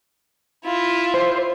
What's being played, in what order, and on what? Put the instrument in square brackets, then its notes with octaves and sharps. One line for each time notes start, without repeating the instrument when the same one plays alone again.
[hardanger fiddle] E4 F4
[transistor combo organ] C5